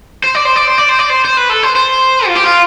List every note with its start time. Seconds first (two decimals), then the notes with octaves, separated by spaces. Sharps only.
0.24 C5
0.35 D5
0.45 C5
0.56 D5
0.67 C5
0.78 D5
0.89 C5
0.99 D5
1.10 C5
1.25 C5
1.38 B4
1.50 A4
1.63 C5
1.76 C5
2.27 F4
2.35 G4
2.44 F4